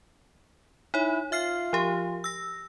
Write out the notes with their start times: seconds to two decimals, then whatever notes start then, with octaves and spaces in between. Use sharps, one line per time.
0.94 D#4 E4 C#5
1.32 F4 E5 F6 C7
1.73 F3 G4
2.24 E6 A#6